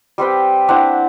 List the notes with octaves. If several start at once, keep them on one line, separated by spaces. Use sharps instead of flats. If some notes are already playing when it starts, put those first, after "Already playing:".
G3 C4 B4 G5
C4 D4 E4 F#5